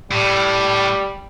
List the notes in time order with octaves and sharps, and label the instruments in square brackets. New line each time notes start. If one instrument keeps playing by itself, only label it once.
[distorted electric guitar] A2 [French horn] G3